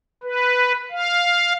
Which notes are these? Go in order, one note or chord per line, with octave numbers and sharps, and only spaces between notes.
B4
F5